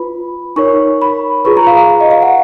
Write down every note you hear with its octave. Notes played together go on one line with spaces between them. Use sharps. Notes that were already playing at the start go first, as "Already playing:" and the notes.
Already playing: F4 B4 B5
D#4 A#4 C#5 C#6
B5
F4 G#4 B4 C#6
A#5
F5
F5
F5
D#5
F5
F#5